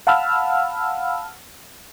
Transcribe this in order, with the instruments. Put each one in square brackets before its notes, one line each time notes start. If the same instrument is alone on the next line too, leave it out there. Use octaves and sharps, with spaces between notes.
[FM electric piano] F5 F#5 A5 B5 E6 F6